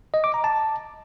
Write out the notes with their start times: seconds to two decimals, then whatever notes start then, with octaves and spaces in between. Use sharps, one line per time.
0.14 D#5
0.24 D6
0.34 A#5
0.44 A5